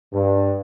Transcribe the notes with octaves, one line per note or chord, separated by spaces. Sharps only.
G2